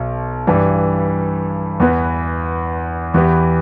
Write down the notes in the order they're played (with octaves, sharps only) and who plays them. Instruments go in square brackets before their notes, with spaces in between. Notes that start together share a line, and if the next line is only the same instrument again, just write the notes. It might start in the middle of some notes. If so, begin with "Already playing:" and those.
Already playing: [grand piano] B1 B2
G2 E3 G3
E2 E3 B3
E2 E3 B3 G4